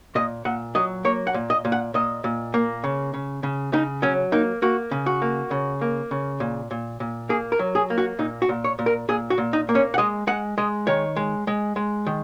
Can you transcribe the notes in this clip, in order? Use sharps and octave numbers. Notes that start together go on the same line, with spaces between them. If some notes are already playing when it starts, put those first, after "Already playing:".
A#2 D#5
A#2 F#5
F#3 D#5
A#3 C#5
F#5
A#2
D#5
A#2
F#5
A#2 D#5
A#2
A#3
C#3
C#3
C#3
C#3 D#4
F#3 C#4
A#3 D#4
A#3 F#4
C#3
F#4
A#3
C#3
A#3
C#3
A#2
A#2
A#2
A#3 G#4
A#4
F#3
G#4
A#3
F#4
A#2 D#4
F#4
A#2
C#5
A#2
A#4
A#2 G#4
F#4
A#2
D#4
A#3
C#4
F#5
G#3 D#5
G#3 F#5
G#3 D#5
D#3 C#5
G#3
G#3
G#3
D#3